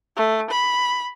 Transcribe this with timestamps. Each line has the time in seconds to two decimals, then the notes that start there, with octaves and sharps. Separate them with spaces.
0.16 A3
0.51 B5